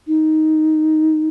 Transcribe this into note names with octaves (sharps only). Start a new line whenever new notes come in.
D#4